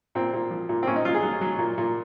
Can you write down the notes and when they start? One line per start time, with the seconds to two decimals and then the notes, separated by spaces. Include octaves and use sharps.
0.15 A#2 C4
0.33 A#2
0.51 F3
0.69 A#2
0.83 C4
0.87 A#2 C#4
0.96 D#4
1.05 F#3 F4
1.14 G#4
1.23 F#3
1.41 F#3
1.59 A#2
1.78 A#2